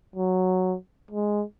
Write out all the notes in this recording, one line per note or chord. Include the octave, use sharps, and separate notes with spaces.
F#3
G#3